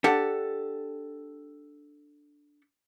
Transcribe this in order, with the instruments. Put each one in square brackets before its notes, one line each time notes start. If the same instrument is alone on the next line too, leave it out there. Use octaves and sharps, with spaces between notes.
[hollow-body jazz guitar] D4 G4 A4 F#5